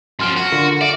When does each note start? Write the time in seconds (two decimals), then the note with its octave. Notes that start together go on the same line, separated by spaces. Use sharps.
0.19 F#2 F3 C6 F6 D7
0.37 F#4
0.52 D3 F4 A#4
0.81 D5 E5